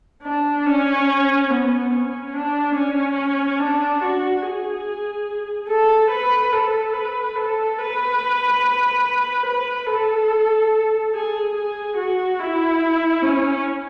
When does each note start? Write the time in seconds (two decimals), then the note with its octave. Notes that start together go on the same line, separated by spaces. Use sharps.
0.23 D4
0.66 C#4
1.50 B3
1.91 C#4
2.34 D4
2.75 C#4
3.59 D4
4.01 F#4
4.43 G#4
5.69 A4
6.11 B4
6.53 A4
6.94 B4
7.36 A4
7.78 B4
9.46 B4
9.87 A4
11.14 G#4
11.55 G#4
11.97 F#4
12.39 E4
13.23 C#4